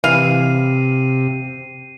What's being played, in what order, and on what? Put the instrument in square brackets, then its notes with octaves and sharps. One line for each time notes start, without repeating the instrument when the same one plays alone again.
[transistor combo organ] C3 [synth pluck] E3 [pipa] F5 [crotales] C7 D#7